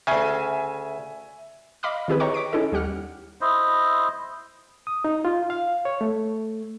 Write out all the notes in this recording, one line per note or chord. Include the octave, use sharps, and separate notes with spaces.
D2 C#3 E5 G#5
D#5 F5 B5 D6 F6
D#3 C4 E4 G4 G#4 B4
C#5 D#5 G5 A#5 C#6 D6
D6 B6 D7
C#4 D#4 E4 G#4 A4 D#5
D#2 G3 G4 F#5 F6
E4 C5 D#5
D#6
D#4
F4
F5
C#5
A3